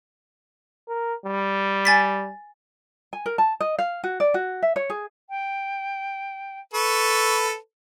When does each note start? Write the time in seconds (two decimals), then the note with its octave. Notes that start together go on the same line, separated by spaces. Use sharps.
0.88 A#4
1.26 G3
1.85 G#5 A6 B6
3.13 G#5
3.26 A#4
3.38 A5
3.61 D#5
3.79 F5
4.04 F#4
4.20 D5
4.34 F#4
4.62 E5
4.76 C#5
4.90 G#4
5.30 G5
6.74 A4 B4 C#6